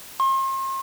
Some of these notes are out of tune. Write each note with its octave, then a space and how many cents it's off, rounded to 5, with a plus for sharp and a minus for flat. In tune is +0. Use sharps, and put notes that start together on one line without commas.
C6 +40